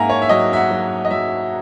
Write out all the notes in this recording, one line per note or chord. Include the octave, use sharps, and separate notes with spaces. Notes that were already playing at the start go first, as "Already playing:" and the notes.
Already playing: G#2 A#3 E5 F#5 G#5 A#5
C#5
E5
F#3 D#5
E5
F#5
F#3
D#5
F#3 E5